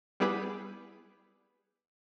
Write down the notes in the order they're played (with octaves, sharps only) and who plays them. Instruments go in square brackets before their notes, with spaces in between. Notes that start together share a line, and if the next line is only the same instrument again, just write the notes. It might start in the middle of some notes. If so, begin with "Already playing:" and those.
[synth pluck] G3 B3 E4 G4 G#4 B4